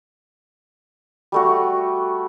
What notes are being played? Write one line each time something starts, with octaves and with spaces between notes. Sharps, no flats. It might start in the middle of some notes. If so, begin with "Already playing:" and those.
G3 A3 F#4